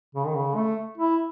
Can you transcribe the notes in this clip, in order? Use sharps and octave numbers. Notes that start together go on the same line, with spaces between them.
C#3
D#3
C#3
A3
E4